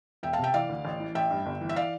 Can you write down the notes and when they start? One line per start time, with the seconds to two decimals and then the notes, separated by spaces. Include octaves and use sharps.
0.23 E1 E5 G5
0.33 F5 A5
0.39 C3 E5 G5
0.54 E3 D5 F5
0.69 D2
0.85 A1
1.00 E3
1.15 A1 E5 G5
1.31 G2
1.46 G1
1.61 E3
1.69 E5
1.76 D5 F5